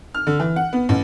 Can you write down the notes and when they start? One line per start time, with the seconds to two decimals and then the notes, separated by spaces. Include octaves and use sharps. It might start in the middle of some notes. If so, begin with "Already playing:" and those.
0.14 F6
0.27 D3
0.40 E3
0.56 F#5
0.73 B3
0.89 A1